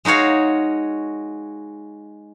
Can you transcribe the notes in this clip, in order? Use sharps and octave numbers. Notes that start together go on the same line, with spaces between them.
G#3 D#4 F#4 C#5 F5